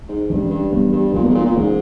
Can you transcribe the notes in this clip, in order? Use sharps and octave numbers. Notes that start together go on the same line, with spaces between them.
G#2
G2 E3 G#3 C#4
G2
G2 E3 G3 B3
G2
A#2 E3 G3 B3
B2
G#2
A#2
A#2
G#2 E3 G#3 C#4